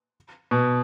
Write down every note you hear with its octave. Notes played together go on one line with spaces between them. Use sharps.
B2